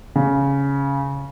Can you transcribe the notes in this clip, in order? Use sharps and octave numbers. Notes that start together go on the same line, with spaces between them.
C#3